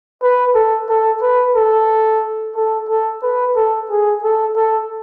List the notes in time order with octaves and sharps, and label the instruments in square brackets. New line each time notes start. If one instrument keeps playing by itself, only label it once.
[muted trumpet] B4
A4
A4
B4
A4
A4
A4
B4
A4
G#4
A4
A4